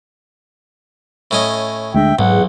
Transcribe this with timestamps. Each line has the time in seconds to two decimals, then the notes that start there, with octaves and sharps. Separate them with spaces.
1.31 A2 C#4 D#5
1.94 D2 G#3 D4 E5 G5
2.19 B1 E2 G#2 F#5